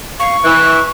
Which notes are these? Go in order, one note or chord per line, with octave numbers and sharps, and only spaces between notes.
F5 C#6
E3 F#6